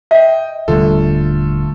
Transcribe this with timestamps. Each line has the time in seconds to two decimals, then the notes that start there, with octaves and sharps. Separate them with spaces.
0.11 D#5 E5 G5
0.68 D#1 D3 G3 A3 F4 A4